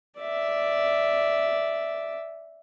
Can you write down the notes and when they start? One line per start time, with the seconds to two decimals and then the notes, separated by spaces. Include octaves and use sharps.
0.20 D5 E5